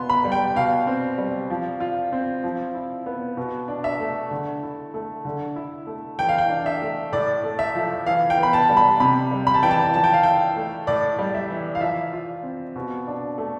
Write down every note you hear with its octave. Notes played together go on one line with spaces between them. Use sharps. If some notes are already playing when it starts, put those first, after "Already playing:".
Already playing: B2 B3 C6
B5
G3
G5
B2 F5
C4
G3
F3
F4
C4
F3
E4
B3
B2
D4
E5
A3
D3
E4
A3
D3
E4
A3
E3 G5
F5
G5
D4
E5
A3
A2 D5
A3
E5
F3
E3 F5
G5
B3
B5
A5
G3
B5
C3 B5
G3
B5
A5
E3 G5
A5
F3 A5
G5
F5
E4 G5
A3
A2 D5
G3
E5
E3
F5
F3 E5
F4
C4
B2
D4
A3